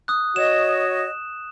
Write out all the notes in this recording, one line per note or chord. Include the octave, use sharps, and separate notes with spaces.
D#6 F#6
F#4 C#5 D#5 E7